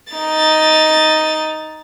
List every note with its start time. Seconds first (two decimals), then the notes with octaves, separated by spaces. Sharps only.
0.13 D#4 A6